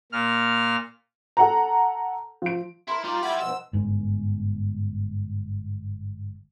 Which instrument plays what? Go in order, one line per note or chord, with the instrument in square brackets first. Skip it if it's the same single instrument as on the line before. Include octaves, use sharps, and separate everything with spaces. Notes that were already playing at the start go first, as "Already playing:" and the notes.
[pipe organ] A#2 F6
[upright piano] A4 F#5 A#5
F3 D7
[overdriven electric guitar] E4 [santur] A#4 A5 C6
[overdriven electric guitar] G3 D5 [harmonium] D#4 [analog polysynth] F4
[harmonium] E4 [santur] F#5 [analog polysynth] B5 G#6
[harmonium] G2 B2 F3 [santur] D#5 [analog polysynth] E6
[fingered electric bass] G1 G#2